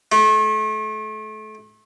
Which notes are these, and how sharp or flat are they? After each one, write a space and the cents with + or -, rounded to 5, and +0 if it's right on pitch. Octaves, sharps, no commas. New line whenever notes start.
A3 -30